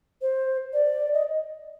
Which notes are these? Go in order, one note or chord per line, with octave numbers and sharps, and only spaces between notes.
C5
D5
D#5